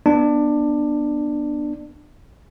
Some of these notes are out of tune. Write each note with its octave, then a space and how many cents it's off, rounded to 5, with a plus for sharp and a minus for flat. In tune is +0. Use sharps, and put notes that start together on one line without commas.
B3 -15 D4 +15